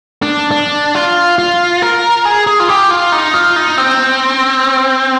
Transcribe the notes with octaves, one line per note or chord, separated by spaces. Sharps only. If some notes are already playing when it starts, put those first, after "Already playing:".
D4
D4
F4
F4
A#4
G#4
G#4
F4
G4
F4
D#4
F4
D#4
C4